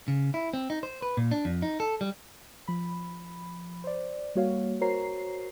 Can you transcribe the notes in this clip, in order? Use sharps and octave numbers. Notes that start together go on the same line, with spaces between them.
C#3
E4
C4
D#4
C5
B4
A#2
D4
F2
D#4
A4
G3
F3 B5
C5 D5
G3 A#3 F#4 C#5 F5
F#4 A#4 C5 C#5 A#5 C7